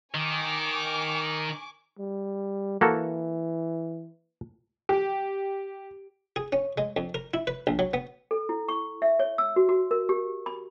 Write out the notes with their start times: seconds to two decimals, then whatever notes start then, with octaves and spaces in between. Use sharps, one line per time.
0.14 D#3 G#5 C#6 D6
1.99 G3
2.81 E3 A#3 F#4 A4
4.89 G4
6.36 G#4
6.52 C#4
6.78 G#3
6.97 F2
7.15 A#4
7.34 E4
7.47 B4
7.67 A#1
7.79 F#3
7.94 B3
8.31 A4
8.49 E4
8.68 C#6
9.02 E5
9.19 C#5
9.38 E6
9.56 F#4
9.69 F#4
9.91 A#4
10.09 G4
10.46 B5